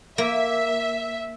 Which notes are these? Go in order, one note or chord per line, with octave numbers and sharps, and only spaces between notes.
A#3 E5